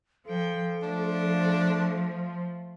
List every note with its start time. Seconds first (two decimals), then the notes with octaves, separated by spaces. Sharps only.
0.26 F3 A4 G5
0.83 F3 A3 D4